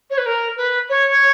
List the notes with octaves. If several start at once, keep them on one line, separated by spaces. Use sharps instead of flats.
C#5
B4
A#4
B4
C#5